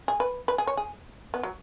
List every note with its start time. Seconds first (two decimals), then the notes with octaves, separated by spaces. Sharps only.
0.08 G#4
0.20 B4
0.48 B4
0.58 G#4
0.67 C#5
0.77 G#4
1.34 B3
1.43 F#3